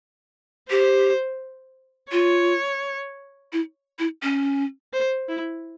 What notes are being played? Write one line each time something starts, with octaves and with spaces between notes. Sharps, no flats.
G4 C5
F4 C#5
E4
E4
C#4
C5
E4